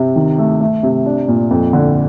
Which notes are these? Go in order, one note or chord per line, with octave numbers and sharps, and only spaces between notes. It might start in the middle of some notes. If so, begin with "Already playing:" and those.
Already playing: C3
D#3
A3
A3
C3
D4
A#2
F2
D3